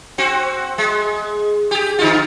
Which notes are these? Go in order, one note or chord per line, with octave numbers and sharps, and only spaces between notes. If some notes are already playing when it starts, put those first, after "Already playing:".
C4 F#4
G#3
G4 G#4
D3 D#4 F4